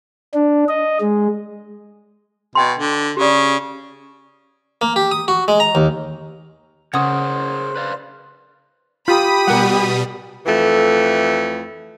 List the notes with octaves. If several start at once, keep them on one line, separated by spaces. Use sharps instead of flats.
D4
D#5
G#3
B2 D#5 G5 C6
D3
C#3 G4 D5
A#3
G4
D#6
F#4
G#3
A#5
D#2
C#3 G#4 A#4 C5 C#5 F#5 D#6
B4 D5 F5
F4 G4 A#5 B5 D#6
B2 G3 A#4 F#5
F2 E3 A3